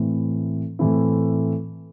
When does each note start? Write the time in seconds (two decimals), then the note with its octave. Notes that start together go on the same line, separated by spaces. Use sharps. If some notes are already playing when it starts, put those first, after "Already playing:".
Already playing: A2 E3 A3 C4 E4
0.79 A2 E3 A3 C4 E4